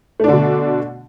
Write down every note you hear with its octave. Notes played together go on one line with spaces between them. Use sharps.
B2 D3 A3 D4